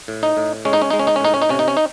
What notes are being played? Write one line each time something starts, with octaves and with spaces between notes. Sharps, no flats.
A2
D#4
A2
G#3 C#4
D#4
C#4
G#3 D#4
C#4
D#4
C#4
A2 D#4
C#4
D#4
C3 C#4
D#4
C#4
D#4